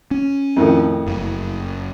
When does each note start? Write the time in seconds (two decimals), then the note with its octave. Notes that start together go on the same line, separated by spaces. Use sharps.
0.11 C#4
0.56 F2 A2 D#3
1.07 F#1